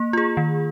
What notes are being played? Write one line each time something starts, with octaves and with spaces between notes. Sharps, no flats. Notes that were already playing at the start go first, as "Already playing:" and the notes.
Already playing: A#3
F4 G#4
D#3